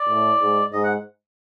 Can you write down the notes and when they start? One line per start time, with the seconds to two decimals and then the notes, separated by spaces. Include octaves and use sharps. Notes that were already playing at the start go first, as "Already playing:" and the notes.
Already playing: D5
0.09 A2
0.41 G#2
0.72 G#2 D#5
0.84 F#5